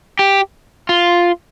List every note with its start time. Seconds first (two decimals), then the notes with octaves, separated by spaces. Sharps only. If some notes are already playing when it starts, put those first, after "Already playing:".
0.19 G4
0.89 F4